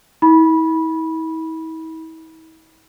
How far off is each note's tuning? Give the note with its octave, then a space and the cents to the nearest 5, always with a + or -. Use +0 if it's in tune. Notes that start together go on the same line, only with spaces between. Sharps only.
E4 -45 B5 -15